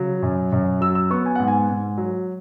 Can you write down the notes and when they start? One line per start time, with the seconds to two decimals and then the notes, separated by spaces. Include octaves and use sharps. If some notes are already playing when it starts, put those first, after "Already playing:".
Already playing: C#3 F#3
0.23 F#2
0.52 F#2
0.81 F#3 E6
0.95 E6
1.11 B3 C#6
1.26 G#5
1.35 G#2 F#5
1.48 G#5
1.70 G#2
1.98 F#3